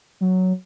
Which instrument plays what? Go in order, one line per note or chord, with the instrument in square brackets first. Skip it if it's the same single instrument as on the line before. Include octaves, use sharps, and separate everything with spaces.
[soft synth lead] F#3